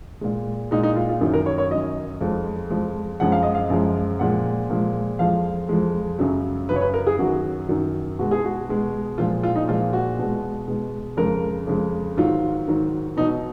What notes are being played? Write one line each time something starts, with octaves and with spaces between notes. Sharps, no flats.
A#2 G#3
A#2 G#3 D#4
D#4
F4
F4
F#2 D#3 F#3
A#4
C#5
C#5
F#2 D#3 F#3 D#5
F2 F3 G#3
F2 F3 G#3
F#2 F3 G#3 F#5
F5
D#5
F5
F#2 F3 G#3
A#2 F3 G#3 F#5
A#2 F3 G#3
F2 F3 G#3 F5
F2 F3 G#3
F#2 C#3 F#3
F#2 C#3 F#3 B4
C#5
B4
A#4
G#4
F#2 D#3 F#3 F#4
F#2 D#3 F#3
B2 G#3 F#4
G#4
F#4
B2 G#3
A#2 F3 G#3 F4
F4
D#4
A#2 F3 G#3 F4
F#4
B2 G#3
B2 G#3
F2 C#3 G#3 A#4
F2 C#3 G#3
G#2 D#3 F#3 F4
G#2 D#3 F#3
B2 F#3 D#4